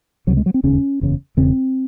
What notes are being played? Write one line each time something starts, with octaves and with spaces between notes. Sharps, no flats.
C#2 C3 F#3
G#3
F#3
C4
E1 D#2 C#3 C#4
F#1 E2 C#3
E1 E2 C#3 C4